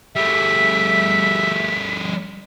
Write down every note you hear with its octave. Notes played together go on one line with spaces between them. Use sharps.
G3 A3 E5 B6